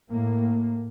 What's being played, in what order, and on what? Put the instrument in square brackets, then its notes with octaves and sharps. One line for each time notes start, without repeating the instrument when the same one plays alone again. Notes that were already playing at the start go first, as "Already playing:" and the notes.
[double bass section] A2 A#3